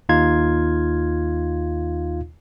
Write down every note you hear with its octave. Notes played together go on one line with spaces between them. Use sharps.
D#2 D#4 F4 F5 G#6